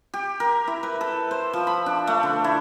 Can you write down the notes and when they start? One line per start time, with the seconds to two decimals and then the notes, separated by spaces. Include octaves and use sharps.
0.14 G4
0.40 A#4
0.68 E4
0.83 B4
1.01 A4
1.31 C5
1.53 F3
1.67 B5
1.86 D4
2.07 A3
2.23 D3
2.44 E4